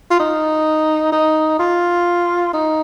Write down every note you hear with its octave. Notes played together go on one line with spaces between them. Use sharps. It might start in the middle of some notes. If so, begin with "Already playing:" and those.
F4
D#4
D#4
F4
D#4